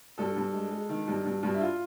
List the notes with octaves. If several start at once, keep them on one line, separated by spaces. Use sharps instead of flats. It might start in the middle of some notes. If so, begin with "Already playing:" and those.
G2 A4
G2
G#3
G#3
D#3
G2
G2
G2
E4
F4